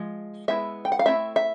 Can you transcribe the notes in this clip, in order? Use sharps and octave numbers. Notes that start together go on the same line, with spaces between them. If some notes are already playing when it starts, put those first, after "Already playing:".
Already playing: F3 G#3
G#3 B3 E4 E5
G5
F#5
F5
A3 C4 E4 E5
E5